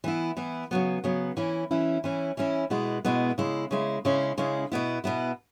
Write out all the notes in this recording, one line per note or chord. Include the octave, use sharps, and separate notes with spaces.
E3 B3 E4
E3 B3 E4
C#3 F#3 B3
C#3 F#3 B3
E3 C#4 E4
E3 C#4 E4
E3 C#4 E4
E3 C#4 E4
B2 G#3 B3 E4
B2 G#3 B3 E4
C#3 G#3 E4
C#3 G#3 E4
C#3 G#3 C#4 E4
C#3 G#3 C#4 E4
B2 B3 E4
B2 B3 E4